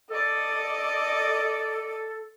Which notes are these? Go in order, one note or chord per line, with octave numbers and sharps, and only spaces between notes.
A4 D5 D#5